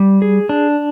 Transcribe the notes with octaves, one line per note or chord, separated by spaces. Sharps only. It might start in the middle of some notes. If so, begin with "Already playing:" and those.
Already playing: G3
G#4
D4